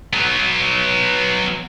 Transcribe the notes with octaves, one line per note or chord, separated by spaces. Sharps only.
F#3 B3